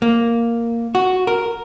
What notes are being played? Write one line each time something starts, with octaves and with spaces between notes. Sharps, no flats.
A#3
F#4
A#4